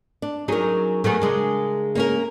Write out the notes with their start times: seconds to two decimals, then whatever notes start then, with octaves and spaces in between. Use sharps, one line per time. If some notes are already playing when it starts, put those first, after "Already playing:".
0.22 D4
0.48 F#3 C#4 D#4 G#4 A#4
1.04 F#3 A3 B3 G#4 A#4
1.22 C#3 G#3 D4
1.95 A#3 C#4 A#4